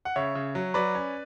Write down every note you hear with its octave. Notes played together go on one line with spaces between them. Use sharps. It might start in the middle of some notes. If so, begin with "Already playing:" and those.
F#5
C#3 C#5 E5
C#3
F#3
F#3 B4 D5
C#4